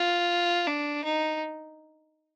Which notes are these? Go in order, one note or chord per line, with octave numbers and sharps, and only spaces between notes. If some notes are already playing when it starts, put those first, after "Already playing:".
Already playing: F4
D4
D#4